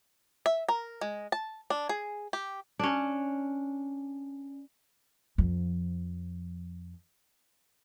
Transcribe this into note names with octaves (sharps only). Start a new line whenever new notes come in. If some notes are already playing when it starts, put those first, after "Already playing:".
E5
A#4
G#3
A5
D4
G#4
G4
C#4 D4
F2 F3